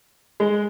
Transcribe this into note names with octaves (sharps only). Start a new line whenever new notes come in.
G#3